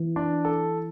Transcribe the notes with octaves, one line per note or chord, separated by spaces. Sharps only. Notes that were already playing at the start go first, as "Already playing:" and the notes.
Already playing: E3
D4
A4